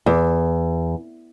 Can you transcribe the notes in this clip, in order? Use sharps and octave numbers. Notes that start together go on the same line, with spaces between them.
E2